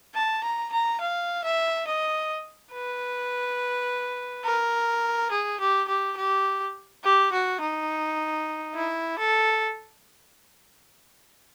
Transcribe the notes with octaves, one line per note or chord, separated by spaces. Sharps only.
A5
A#5
A#5
F5
E5
D#5
B4
A#4
G#4
G4
G4
G4
G4
F#4
D#4
E4
A4